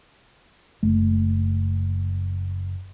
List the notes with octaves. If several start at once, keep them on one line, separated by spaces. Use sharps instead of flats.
F#1 A3